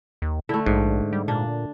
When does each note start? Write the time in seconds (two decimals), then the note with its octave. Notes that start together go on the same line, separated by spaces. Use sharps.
0.22 D#2
0.49 D3 A3 E4
0.66 A#1 G#2
1.13 G3
1.28 A#2 D4